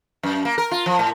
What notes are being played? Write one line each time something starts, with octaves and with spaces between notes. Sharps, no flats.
F#2
A#3
A#4
F4
F3
A2